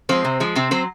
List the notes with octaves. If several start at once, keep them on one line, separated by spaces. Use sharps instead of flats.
F3 G#3 C4 C5
C3
F3 G#3
C3 C4 C5
F#3 C4 C5